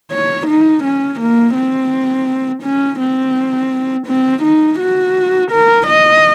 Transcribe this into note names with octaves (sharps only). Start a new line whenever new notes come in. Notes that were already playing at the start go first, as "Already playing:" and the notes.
C#5
D#4
C#4
A#3
C4
C#4
C4
C4
D#4
F#4
A#4
D#5